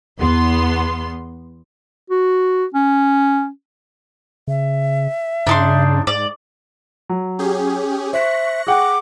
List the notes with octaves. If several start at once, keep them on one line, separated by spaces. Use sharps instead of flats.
E2 B3 C6
F#4
C#4
C#3 E5
G2 C#3 D4 D#4 C6
G#2 D5
F#3
C#4 G4 G#4
C5 E5 C#6 F#6 A#6
G#4 F#5 G5 D6